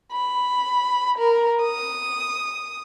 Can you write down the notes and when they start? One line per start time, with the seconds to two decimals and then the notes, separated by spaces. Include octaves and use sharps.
0.12 B5
1.18 A#4
1.63 D#6